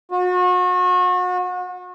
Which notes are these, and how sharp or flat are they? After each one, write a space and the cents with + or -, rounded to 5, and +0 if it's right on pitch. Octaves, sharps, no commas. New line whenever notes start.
F#4 -35